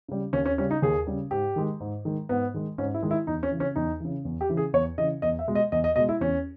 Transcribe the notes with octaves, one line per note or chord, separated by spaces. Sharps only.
C#3 G3
D#2 C#4
C#4
C#3 G3 C#4
D#4
D#2 G#4
C#3 G3
G#2 G4
D#3 G#3
G#2
D#3 G#3
G#2 B3
D#3 G#3
G#2 C#4
E4
D#3 G#3
E4
E2 D#4
C#4
C#3 E3
C#4
E2 D#4
C#3 E3
E2
G4
C#3 E3
G#4
E2 C#5
C#3 E3 D#5
E2 D#5
E5
B2 G#3
D#5
E2 D#5
D#5
B2 G#3 D#5
E4
E2 C#4